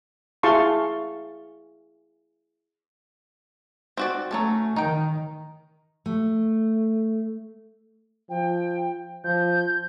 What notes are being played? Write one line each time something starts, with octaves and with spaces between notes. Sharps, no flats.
E4 G#4 F5 A5 C6 C#6
C4 F#4 D5
F#3 A3 C#4 A4
D#3 D#4 G5
A3
F3 G5
F3 G6